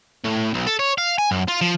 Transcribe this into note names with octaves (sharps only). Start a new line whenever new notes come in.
A2
B1
A4
C#5
F5
G#5
F#2
F4
F3